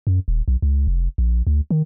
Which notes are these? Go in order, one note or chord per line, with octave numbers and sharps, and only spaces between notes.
F#2
D#1
B1
C#2
F1
A#1
D2
D#3